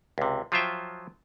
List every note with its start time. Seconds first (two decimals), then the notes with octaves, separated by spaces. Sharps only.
0.18 C#2 C3
0.52 F3 F#3 F4 C5 E5 G5